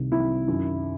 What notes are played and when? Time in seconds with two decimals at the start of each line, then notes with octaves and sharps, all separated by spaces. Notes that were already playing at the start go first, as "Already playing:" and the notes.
Already playing: C2 C3 D#3
0.12 C2 C3 D#3 E4
0.48 F#2 D#3